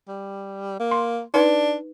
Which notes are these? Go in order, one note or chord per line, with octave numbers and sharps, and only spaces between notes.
G3
A#3
C6
D4 D#4 B4